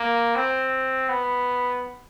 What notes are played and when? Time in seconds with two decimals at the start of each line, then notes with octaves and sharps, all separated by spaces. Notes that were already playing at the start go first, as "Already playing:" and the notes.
Already playing: A#3
0.36 C4
1.09 B3